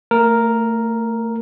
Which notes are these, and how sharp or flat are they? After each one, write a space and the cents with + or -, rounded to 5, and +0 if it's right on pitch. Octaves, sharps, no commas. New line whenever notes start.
A3 +35 A#4 +0